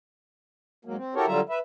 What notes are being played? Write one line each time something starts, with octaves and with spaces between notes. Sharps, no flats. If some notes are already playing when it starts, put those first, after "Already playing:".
G#2 F#3 A#3
C4
E4 F#4 G4 A4 A#4 C#5
D3 F#3 G3 F4 E5 A#5
B4 E5